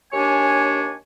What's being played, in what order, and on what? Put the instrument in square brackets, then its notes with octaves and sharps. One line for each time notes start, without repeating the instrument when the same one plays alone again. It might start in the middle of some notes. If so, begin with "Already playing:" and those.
[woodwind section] D#2 D4 G4 C#5 G#5